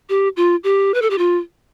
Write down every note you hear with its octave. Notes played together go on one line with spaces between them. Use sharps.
G4
F4
G4
B4
A4
G4
F4